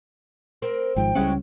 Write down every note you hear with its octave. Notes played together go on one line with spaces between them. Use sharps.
C4 A#4
G#1 G#2 F3 G5
C#2 G3 G#3 C#4 E4 F#4